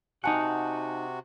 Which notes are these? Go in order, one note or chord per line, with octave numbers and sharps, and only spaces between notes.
C3 D#4 F#4 F#5 G#5 A5